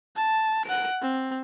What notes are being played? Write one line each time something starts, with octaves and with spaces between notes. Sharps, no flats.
A5
F#5 D7
C4